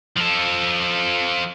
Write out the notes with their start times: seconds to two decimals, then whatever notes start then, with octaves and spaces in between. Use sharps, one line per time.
0.17 F3 A4